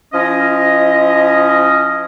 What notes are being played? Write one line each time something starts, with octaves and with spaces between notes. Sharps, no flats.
F3 C#4 E4 D#5